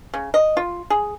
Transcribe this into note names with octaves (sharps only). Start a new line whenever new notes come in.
C#3
D#5
F4
G#4